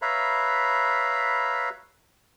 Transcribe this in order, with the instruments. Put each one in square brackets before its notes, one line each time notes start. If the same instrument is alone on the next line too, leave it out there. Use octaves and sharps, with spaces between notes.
[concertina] B4 C#5 E5 F5 A#5 B5